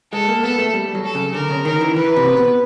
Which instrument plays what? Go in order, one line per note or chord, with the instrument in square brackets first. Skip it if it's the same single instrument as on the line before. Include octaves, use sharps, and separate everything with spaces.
[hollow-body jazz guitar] G#3 [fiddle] A4
[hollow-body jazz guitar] A#3
[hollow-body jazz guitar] B3 [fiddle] A4
[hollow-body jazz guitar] A3
G3
F#3
[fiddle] A4
[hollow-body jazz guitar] C#3
[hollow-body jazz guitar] D3 [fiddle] A#4
[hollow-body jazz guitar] C#3
[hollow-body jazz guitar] D#3 [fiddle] A#4
[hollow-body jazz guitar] E3
[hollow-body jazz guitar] E3 [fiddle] B4
[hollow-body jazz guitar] C3
B2